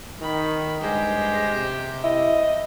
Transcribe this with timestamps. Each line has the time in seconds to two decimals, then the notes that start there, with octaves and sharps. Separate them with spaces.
0.22 D#3 B5
0.81 G2 G#3 G4 C5
1.53 C3
2.04 E4 D#5